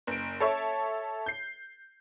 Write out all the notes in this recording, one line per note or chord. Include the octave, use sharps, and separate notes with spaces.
F#1 D7
A4 C#5 E5 C#6
G6 C7